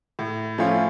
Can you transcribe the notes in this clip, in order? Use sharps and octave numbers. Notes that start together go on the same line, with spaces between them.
A2
F3 A3 C#4 F4